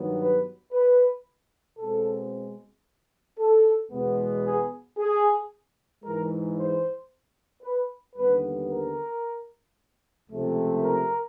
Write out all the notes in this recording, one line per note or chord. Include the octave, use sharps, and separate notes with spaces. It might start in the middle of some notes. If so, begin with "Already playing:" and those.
Already playing: G2 D#3 F#3 B3
B4
B4
B2 G#3 C4 A4
A4
E2 B2 G#3 B3
G#4
G#4
G#2 E3 G#3 A#4
C5
B4
D#2 D3 G3 B3 B4
A#4
C#2 C3 F3 A3
A#4